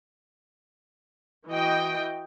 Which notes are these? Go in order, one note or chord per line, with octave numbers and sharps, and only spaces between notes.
E3 F#4 D#5 G5